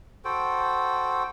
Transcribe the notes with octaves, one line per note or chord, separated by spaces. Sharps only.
F#4 A4 C5 G5